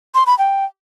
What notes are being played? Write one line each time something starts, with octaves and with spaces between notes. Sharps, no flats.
C6
B5
G5